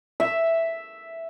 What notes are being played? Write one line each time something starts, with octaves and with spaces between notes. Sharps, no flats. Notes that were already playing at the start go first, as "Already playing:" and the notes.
E5